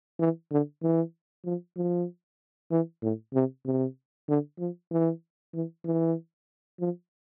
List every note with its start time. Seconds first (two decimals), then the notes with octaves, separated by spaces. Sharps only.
0.19 E3
0.51 D3
0.82 E3
1.45 F3
1.77 F3
2.71 E3
3.02 A2
3.34 C3
3.66 C3
4.28 D3
4.59 F3
4.91 E3
5.54 E3
5.85 E3
6.80 F3